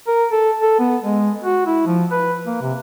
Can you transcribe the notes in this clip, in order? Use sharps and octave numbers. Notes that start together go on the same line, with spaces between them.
A#4
A4
A4
B3
G#3
F#4
E4
F3
B4
A#3
C3